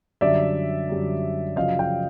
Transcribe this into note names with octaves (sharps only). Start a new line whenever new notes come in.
F#2 D3 G3 D5 E5
F#2 D3 G3
F#2 C#3 F3 D#5 F5
F5 G5